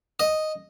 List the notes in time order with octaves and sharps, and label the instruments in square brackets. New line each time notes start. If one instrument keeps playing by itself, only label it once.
[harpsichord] D#5